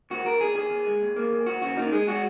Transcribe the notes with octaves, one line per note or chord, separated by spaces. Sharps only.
D#2 F#4
D#2 A#4
D#2 G#4
D#2 G#4
D#2
G#3
D#2
A#3
D#2
D#2 F#4
C#3 F#4
A#3 D#4
G#3 G#4
G#3 F#4